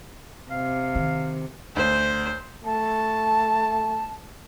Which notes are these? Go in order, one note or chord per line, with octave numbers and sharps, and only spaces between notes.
C3 F5
D#3
D2 C5
A3 A5